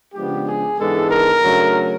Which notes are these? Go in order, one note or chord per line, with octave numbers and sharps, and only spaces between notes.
C#3 F3 G#3 B3 D4 G4
G#4
G#2 E3 G#3 B3 D4 A4
A#4
C#3 F#3 A3 D4